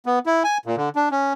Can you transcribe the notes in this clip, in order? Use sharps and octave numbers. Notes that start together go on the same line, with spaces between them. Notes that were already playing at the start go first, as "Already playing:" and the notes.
B3
E4
G#5
A#2
D3
D4
C#4